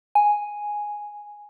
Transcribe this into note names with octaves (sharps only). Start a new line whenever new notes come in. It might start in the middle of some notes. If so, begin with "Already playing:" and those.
G#5